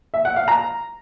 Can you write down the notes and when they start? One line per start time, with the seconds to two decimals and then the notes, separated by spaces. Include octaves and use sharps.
0.14 E5
0.25 F#5
0.36 F5
0.48 A#5